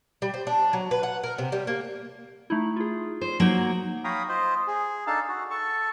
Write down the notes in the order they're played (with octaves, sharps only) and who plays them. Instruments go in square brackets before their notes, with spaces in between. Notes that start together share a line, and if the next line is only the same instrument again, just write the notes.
[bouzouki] G3
C5
D4
F#3
B4
F#5
A#4
C3
G3
A#3
[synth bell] A3 D#4 E4
F4 G#4
[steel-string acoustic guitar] C5
[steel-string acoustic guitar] F#3 A#3 [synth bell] D#4 F#7
[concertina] C#5 F5 G5 A#5 B5 D#6
F4 C5 D#5
G#4
D4 D#4 A4 F5 A5
F#4
A4 A5 C#6